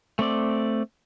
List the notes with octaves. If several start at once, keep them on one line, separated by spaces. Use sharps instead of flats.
A3 C4 D5